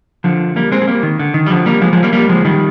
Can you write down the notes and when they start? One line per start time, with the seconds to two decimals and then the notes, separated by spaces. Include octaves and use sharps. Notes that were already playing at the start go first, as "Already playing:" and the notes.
0.24 D3 F3
0.56 G3 A#3
0.71 G#3 C4
0.82 G#3
0.88 G3 A#3
1.03 D#3
1.19 D3
1.34 D#3
1.46 G3
1.51 D3 F3
1.66 G3 A#3
1.82 F3 G#3
1.93 F3 G#3
2.03 G3 A#3
2.13 G3 A#3
2.29 F3 G#3
2.45 D#3 G3